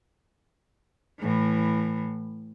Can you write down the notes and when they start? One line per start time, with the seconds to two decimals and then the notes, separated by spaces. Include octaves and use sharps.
1.20 A2 E3